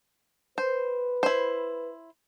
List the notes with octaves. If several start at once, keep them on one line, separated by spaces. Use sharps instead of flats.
B4 C5
E4 C5